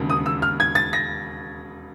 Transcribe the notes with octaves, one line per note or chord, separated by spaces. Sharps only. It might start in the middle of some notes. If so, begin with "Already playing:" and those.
Already playing: E1 D#2 C#3
D#6
E6
F6
G#6
A6
A#6